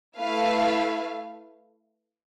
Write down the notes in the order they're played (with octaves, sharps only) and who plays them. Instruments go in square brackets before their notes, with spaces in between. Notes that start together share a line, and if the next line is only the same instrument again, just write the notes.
[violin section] A3 E4 B4 F5